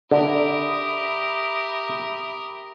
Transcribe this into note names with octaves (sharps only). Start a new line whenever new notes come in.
D3 G4 A#4 E5 B5 D#6